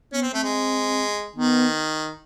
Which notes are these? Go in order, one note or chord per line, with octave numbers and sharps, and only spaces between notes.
B3 C#4
C4
A3 C4
G#3
D#3 B3